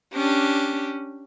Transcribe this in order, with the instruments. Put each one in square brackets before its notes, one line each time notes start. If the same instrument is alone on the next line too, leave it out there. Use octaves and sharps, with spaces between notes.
[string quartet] C#4 D4 G4